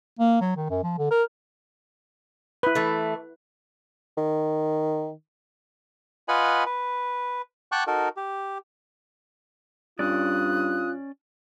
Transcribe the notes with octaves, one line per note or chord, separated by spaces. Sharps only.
A#3
F#3
D#3
F#2
F3
D3
A#4
E4 B4
E3 A3
D#3
F4 B4 D#5 F#5 G#5 B5
B4
F#5 G5 A5 C#6 D6 F#6
D#4 F#4 A4 A#4
G4
G2 C#4 F4 D5 D#6 F#6